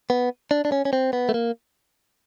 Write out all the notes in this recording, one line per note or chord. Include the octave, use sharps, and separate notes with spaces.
B3
D4
D4
C#4
C#4
C4
B3
A3
A#3